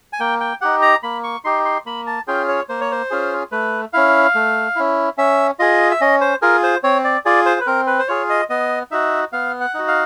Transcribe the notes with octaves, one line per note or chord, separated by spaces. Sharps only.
G#5
A#3 G5
G5
D#4 G4 F#5
A#5
A#3 B5
C#6
D#4 G4 C6
C6
A#3 B5
A5
C#4 F4 G#4 G5
C#5
A#3 C5
C#5
C5
C#4 F4 G#4
A3 B4
C#4 E4 F5
A3
C#4 E4
C#4 E5
F4 G#4 D#5
E5
C#4 D#5
C5
F4 G#4 A#4
C5
C4 C#5
D5
F4 G#4 D5
C5
B4
C4 A#4
B4
C5
F4 G#4 C#5
D#5
B3 D#5
D#4 F#4 E5
B3 F5
F#5
D#4 F#4
F5